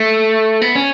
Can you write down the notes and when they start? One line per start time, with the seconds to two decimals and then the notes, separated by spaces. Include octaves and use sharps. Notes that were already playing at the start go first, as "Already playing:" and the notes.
Already playing: A3
0.62 B3
0.75 C#4